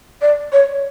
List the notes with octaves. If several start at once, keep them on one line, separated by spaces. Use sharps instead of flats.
D5
C#5